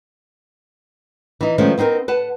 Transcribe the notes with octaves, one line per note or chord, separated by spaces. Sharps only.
E3 D#4
D#3 F3 G#3 A3 C#4
B3 C4 D#4 F#4 A#4
B4 F#5 A5